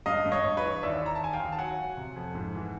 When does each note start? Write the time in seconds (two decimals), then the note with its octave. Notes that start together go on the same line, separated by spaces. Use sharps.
0.06 G2 D#5 F5
0.25 G2
0.32 C#5 D#5
0.44 G2
0.57 B4 C#5
0.64 E3
0.83 D#2 D5 E5
1.01 D#2 A#5
1.15 A5
1.21 D#2 G#5
1.33 F5 G5
1.40 D#2
1.52 A5
1.59 F#3 F#5 G#5
1.78 F#3
1.97 C3
2.16 F2
2.35 G#2
2.55 E3